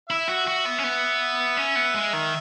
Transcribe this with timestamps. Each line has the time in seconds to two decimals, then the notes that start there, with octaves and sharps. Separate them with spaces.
0.09 E4 E5
0.29 F#4
0.47 F#4
0.65 B3
0.78 C#4
0.84 B3
1.57 C#4
1.76 B3
1.94 G#3
2.13 D#3